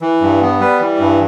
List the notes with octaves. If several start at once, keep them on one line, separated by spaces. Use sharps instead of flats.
E3
G2
B3
G3 B4
E3
G2